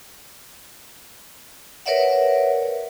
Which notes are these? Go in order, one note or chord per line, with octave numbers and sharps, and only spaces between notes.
A#4 B4 C#5 D5 E5 F#5